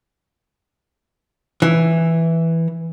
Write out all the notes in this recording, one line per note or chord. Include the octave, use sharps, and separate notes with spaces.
E3